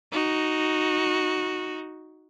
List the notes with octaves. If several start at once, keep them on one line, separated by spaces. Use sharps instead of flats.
D#4 F#4